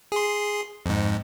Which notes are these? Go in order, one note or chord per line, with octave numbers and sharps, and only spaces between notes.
G#4 C6
F2 G#2